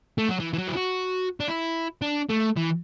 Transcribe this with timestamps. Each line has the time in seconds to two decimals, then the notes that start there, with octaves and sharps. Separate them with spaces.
0.18 A3
0.29 F#3
0.40 E3
0.53 E3
0.58 F#3
0.68 E4
0.77 F#4
1.40 D4
1.48 E4
2.02 D4
2.29 A3
2.56 E3